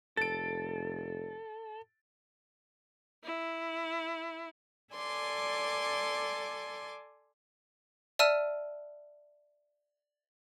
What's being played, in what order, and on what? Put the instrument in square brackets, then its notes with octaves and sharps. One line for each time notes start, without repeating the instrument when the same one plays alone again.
[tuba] F1 [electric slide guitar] A4 [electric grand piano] A6 D7
[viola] E4
[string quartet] A4 D5 G#5 C6 D6
[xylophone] D5 E5 A5 E6 F6 D#7